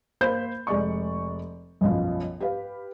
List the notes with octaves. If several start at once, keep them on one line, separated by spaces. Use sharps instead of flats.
A#3 C5 B5 G6
F1 G#3 D5 C#6
B1 F#2 B2 F3
G4 B4 F5